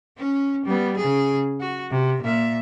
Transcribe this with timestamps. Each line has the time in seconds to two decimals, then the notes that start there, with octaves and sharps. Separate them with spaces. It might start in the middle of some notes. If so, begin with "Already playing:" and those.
0.17 C#4
0.65 G3 B3
0.97 C#3 G#4
1.60 F#4
1.91 C3
2.22 A#2 E5